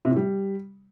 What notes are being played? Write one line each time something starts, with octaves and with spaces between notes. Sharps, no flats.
C3
A2
G3